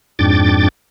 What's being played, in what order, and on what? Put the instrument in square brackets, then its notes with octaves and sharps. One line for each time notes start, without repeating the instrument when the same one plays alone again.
[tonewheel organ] F2 G#2 D4 G5 D6 A6